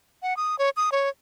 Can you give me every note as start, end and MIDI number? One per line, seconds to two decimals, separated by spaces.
0.22 0.36 78
0.37 0.58 87
0.59 0.70 73
0.77 0.90 87
0.92 1.09 73